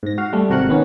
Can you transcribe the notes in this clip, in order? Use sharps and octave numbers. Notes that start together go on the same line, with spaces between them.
G#2 A#6
F#4 F5
G3 A3
G#1 C3 F#4 A#4 F#5 F#6
D#3 B3 C#4